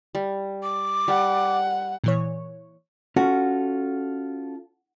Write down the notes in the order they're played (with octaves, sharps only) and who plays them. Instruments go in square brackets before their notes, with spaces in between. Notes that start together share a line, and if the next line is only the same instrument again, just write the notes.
[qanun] G3
[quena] D6
[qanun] G3 [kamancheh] F#5
[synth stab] A#2 E3 C#5
[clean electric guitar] C#4 F4 A4 [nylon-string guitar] F#4